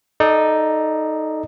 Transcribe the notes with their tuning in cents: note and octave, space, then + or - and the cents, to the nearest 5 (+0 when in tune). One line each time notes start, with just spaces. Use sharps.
D#4 +0 A4 -10 D5 +20